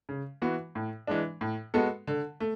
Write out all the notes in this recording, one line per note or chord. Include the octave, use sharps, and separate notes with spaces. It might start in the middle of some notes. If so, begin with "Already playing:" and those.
C#3
E3 B3 F#4
A2
E3 G#3 D4
A2
G#3 B3 F#4 A4
D3
A3